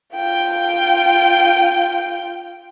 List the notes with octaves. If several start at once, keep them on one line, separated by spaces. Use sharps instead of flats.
F4 G5